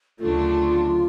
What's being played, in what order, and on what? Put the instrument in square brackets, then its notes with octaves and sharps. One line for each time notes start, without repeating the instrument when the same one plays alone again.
[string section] D2 C#3 F#3 A3 D4 [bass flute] F4